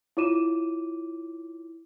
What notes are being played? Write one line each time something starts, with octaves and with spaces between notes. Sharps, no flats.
E4 F4 C#5 D6 D#7 E7